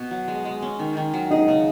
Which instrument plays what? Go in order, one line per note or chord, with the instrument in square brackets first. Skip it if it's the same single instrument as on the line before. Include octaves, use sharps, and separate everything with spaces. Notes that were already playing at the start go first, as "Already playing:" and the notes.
Already playing: [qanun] B2
F#3
G#3
G#3
C#4
D#3
D#3
F#3
[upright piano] D#4 [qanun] G#4
[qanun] C#3